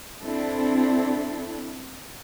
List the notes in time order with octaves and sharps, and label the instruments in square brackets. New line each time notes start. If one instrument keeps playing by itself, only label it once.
[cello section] C4 D4 E4 A4